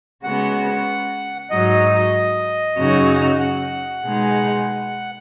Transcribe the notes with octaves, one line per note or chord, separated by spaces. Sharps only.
C#3 G#3 B3 F#4 F#5
G#2 F#3 D#4 D#5
F#2 C#3 F#3 D#4 F#4
F#5
B2 G#3 D#4 G#4